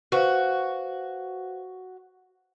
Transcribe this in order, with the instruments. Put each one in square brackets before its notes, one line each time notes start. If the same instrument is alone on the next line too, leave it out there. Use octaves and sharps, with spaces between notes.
[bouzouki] F#4 [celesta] B4 C5 F5